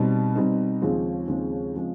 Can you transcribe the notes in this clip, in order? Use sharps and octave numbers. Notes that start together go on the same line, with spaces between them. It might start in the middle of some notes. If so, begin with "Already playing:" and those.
Already playing: B2 G3 C4 D#4
B2 G3 C4 D#4
D#2 C#3 F3 G#3 C4
D#2 C#3 F3 G#3 C4
C#3 F3 G#3 C4